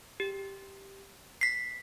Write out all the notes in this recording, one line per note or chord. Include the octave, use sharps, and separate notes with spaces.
G4
B6 C7